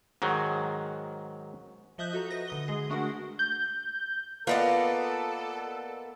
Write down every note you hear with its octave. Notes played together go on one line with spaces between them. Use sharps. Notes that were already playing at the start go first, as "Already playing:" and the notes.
G#2 D#3 F#3
F3 D#5 E5 D#6 F#6 G6
F#4 A4 A#5
B4 A#6
D3 D#6 G7
G#3 G#4
A3 D4 F#4 G#4 A#4 F#5
G6
A#3 B3 F4 A4 B4 D5 D#5 A5